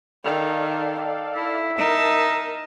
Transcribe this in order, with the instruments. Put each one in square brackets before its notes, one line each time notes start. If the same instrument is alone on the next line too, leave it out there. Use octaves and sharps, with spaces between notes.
[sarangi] D#3 [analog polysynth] A4 D5 F5
[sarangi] E4 [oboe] E5
[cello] D#4 [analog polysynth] A#4 [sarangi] A5